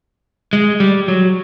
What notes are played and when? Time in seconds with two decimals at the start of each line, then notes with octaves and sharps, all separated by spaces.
0.53 G#3
0.80 G3
1.08 F#3